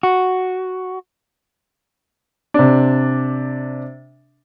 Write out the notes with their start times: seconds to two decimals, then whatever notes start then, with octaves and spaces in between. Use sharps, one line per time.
0.03 F#4
2.54 C3 D4